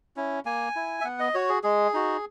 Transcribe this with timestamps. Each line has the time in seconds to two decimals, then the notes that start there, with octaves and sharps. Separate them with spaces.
0.16 C#4 E4
0.45 A#3 G#5
0.76 E4
1.01 E5
1.05 B3 F#5
1.20 D#5
1.34 F#4 C#5
1.49 G#4
1.63 G#3 G#4
1.94 D#4 F#4